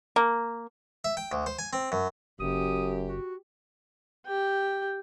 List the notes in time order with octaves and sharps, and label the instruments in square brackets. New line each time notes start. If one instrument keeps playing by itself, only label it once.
[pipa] A#3
[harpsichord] E5
G5
D2
C5
G#5
C4
F#2
[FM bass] F#1 [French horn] F#2 [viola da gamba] G4 [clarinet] D#6
[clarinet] F#4
[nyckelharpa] G4 G5